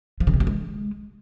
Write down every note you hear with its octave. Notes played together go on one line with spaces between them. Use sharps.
F3
C#3
C3
F#3
G#3